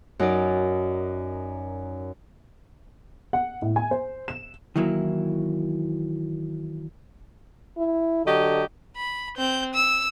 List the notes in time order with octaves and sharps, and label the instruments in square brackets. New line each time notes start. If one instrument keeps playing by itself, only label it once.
[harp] F#2 D#4 A#4 D5
[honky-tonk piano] F#5
A2
G#5
C5
E7
[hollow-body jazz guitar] D#3 E3 F#3 A#3 E4
[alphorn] E4
[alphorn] D3 [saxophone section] F#3 G4 D#5
[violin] B5
C4 G6
E6